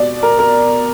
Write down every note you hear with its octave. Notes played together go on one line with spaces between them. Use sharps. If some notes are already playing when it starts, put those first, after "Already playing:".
Already playing: B2 D5
A#4
A#4